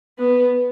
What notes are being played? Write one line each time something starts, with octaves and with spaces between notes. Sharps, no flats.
B3